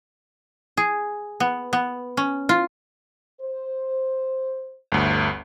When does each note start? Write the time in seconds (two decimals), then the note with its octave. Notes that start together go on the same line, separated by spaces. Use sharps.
0.77 G#4
1.40 B3
1.73 B3
2.17 C#4
2.49 F4
3.41 C5
4.92 G1 D2